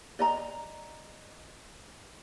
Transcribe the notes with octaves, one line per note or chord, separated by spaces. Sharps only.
D5 D#5 A#5